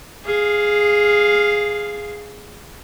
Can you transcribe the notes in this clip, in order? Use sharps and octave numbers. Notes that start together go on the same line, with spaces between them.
G#4 F5